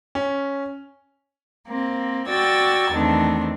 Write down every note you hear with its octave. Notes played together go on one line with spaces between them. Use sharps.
C#4
A#3 C4
F#4 D5 G5 E6 G#6 A6
E2 D#3 A3 C4 D4